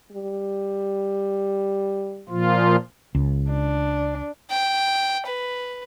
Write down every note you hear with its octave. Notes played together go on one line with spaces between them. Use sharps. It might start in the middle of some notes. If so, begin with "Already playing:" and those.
G3
A#2 F3 F4
C#2
D4
G5
B4